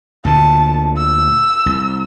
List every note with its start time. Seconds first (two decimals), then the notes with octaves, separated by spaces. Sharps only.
0.25 D2 A#2 D3 A5
0.96 E6
1.66 C2